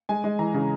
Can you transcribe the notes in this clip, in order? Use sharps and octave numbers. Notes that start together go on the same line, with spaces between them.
G#3 G#5
G#3
E3 A#5
C#3